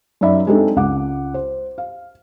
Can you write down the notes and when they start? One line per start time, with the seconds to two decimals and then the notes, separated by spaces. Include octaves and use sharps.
0.21 F#2 D#4 D5 E5 B5
0.47 G#3 C4 D4 D#4 G#4 A4
0.76 C#2 F#5 D6
1.34 C5
1.78 F5